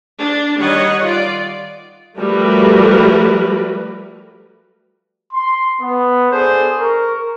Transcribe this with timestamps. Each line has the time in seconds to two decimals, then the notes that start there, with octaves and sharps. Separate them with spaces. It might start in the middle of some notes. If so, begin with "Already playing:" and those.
0.19 D4
0.57 D#3 G3 C#5 D#5 F#5
1.02 F4 D5
2.19 F3 G3 A3 F#4 A#4 B4
5.33 C6
5.81 B3
6.31 D4 G#4 A4 C5
6.79 A#4 C#6